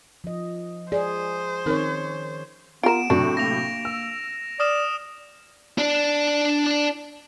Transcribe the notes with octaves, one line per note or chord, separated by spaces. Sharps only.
F3 D#5
G#4 C5 D5
D#3 C4 D#4 A#4 C#5
B3 F4 A#4 D7 E7
A2 C3 F#3 D4 F#4
A#3 A#6 F7
E6
D5 D#6 F6 E7
D4 D5